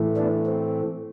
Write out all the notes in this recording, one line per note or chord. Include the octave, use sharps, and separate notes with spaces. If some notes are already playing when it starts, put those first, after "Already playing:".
Already playing: A2 E3 A3
B3 D4
C4